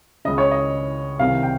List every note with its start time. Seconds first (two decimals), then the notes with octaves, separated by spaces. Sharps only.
0.25 C#2 C#3 D#5
0.38 C#5
0.51 D#5
1.19 C2 C3 D#3 F5
1.43 G5